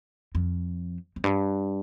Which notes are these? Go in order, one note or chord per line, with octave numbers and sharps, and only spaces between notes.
F2
F2
G2